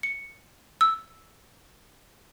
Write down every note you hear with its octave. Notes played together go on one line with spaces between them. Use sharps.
C#7
E6